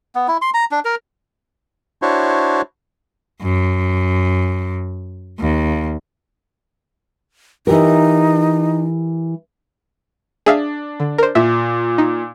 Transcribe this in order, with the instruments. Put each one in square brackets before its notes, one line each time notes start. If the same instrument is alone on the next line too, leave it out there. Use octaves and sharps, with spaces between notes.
[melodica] B3
E4
C6
A#5
D4
A#4
[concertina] D4 E4 F#4 C5 C#5
[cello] F#2
D#2
[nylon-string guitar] E3 G4 A#4 [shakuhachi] D#4
[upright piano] D4 [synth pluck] G#4 E5 F5
[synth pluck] D3
A#4 C5
[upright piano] A#2 [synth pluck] E5
[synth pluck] D#4